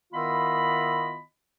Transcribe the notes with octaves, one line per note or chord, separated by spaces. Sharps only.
D#3 B3 E4 F4 D#5 B5